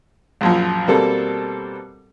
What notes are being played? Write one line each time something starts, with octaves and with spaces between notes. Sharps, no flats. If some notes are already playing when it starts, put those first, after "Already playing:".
A#1 F#2 F3
B2 G3 A#3 C4 A4